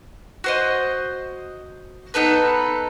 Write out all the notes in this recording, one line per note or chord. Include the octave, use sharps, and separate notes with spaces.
F#4 C5 D#5
B3 D#4 A4 B4